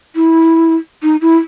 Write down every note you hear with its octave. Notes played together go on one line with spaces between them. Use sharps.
E4
D#4
E4